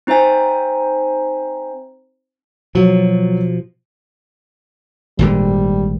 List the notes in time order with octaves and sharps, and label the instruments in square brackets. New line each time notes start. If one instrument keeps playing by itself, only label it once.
[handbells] C4 D#4 C5 E5 G#5
[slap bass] B2 F3 [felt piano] F#3
[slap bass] G#1 A#2 D3 [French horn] G3